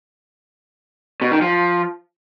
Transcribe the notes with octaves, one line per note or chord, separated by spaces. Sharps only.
B2
D#3
F3